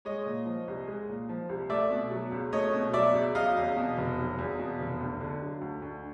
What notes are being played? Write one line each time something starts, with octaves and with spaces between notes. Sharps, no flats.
G#3 C#5 D#5
A#2
F3
C2
G#3
A#2
F3
C2
A3 D5 E5
B2
F#3
C#2
A3 C#5 D#5
B2
F#3 D5 E5
C#2
F#3 D#5 F5
E2
B2
F1
F#3
E2
B2
F1
D2
D3
F#3
D2
D2